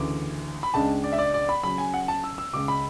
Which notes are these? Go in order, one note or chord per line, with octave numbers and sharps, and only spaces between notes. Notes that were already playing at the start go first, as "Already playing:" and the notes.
Already playing: D2 C#3 E3 D6
B5
C#2 C#3 G#3 D4 A5
D5
E5
D5
D5
B5
C#3 F#3 C#4 B5
G#5
F#5
A5
E6
E6
C#2 C#3 G#3 D6
B5